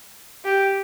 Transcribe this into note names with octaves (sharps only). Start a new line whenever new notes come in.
G4